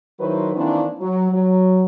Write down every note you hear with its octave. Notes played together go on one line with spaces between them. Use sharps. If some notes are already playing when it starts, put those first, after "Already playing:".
D#3 F#3 E4 B4 C5
D#3 E3 A#3 C4 D4 E4
F#3
F#3